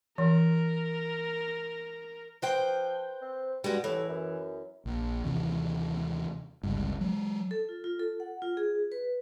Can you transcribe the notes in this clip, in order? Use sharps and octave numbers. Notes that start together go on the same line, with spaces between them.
E3 A#4
F3 B4 C5 G5
C4
G2 G3 G#3 F#4
A2 E3
F#2
A#1
D#2 C3 E3
G1 C#2 G2
F#3 G#3
A4
F4
F4
A4
F#5
F4
G#4
B4